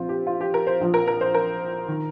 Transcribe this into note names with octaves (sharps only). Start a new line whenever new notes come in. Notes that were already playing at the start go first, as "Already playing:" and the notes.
Already playing: A#1 F3 C4 F4
G4
F4
G4
A#4
C5
A#1 A#2 F3
A#4
A#4
C5
A#4
D#3